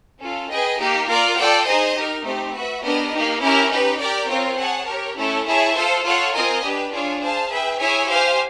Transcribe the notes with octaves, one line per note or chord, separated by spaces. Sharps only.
C#4 F4 A4
G#4 B4 D#5 G5
A#3 D#4 G4
F4 A#4 D5
F4 A4 D5 G5
D#4 G#4 C5 D#5
D#4 G4 A#4
A3 C4 D#4 G4
F#4 B4 E5
B3 D4 G4 A#4 D#5
A#3 D#4 G4
C#4 E4 G4 A#4
D#4 G4 B4
G4 A#4 D5 G5
C4 F4 A#4 C#5
G#4 C#5 F#5 A5
G4 A#4 C#5
A3 C#4 E4 A4 C#5
E4 G#4 C#5 E5 A5
F4 A4 C5
F4 A4 C#5 F#5
C4 F4 A#4 D#5 G#5
D4 G4 B4
D4 F4 G#4 C#5
G#4 C5 F5 A5
G#4 B4 E5 G5
E4 G#4 C#5 E5 G#5
G4 C5 F5 G#5